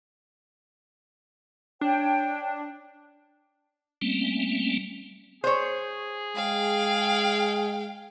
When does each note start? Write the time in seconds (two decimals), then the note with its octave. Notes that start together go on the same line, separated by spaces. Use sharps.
1.81 D4 C#5 G5
4.02 G3 A3 A#3 C4 C#4
5.44 G#4 C5 C#5
6.36 G#3 F5 G5